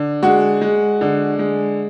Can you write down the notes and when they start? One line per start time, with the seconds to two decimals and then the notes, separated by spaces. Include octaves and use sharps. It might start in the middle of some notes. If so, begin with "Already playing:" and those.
Already playing: D3
0.22 G#3 F#4
0.61 G#3
1.01 D3
1.39 G#3